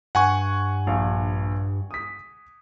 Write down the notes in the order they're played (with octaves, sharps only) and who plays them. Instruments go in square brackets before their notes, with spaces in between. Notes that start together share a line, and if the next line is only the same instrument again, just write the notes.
[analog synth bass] G2 [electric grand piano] F#5 G#5 C#6
[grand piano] A#1 F5
D#6 B6